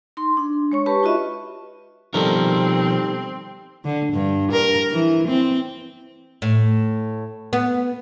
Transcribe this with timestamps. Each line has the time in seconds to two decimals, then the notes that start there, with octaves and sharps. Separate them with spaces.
0.17 D#4 C6
0.37 D4
0.72 G#3 C#5 C#6
0.86 G4 B4 A5 B5 C#6
1.03 D#4 F4 F#4 D#5 E5
2.14 B2 D#3 F3 G3 C4 A4 A#4
3.85 D3
4.13 G2
4.52 A#4
4.92 E3
5.28 C4
6.42 A2
7.53 B3